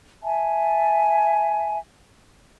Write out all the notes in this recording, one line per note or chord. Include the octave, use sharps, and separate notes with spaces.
E5 G#5 A5